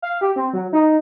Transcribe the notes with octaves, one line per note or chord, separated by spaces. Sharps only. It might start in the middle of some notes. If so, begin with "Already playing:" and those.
F5
G4
C4
F#3
D#4